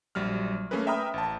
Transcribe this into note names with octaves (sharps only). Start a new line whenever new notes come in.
A#1 F#3 G3 F6
A3 A#3 C#4 G#4 A#4 B4
E5 G5 A#5 B5 D#6 F6
A1 A5